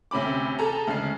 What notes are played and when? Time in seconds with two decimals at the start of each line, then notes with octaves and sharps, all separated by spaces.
0.11 D2 C3 C#4 B5 D6
0.59 G#4 A4 A#5
0.87 D2 C#3 G#3 C7